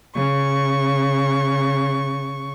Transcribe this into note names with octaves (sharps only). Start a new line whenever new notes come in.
C#3 C#6